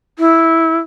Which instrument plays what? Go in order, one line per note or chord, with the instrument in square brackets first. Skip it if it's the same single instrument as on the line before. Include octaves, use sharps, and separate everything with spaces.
[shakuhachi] E4